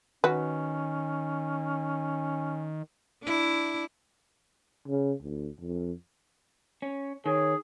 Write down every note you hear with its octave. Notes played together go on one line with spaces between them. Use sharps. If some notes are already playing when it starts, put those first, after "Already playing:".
D#3 C#4 F#4 B4
D4 E4
C#3
D2
F2
C#4
D#3 G#4 C#5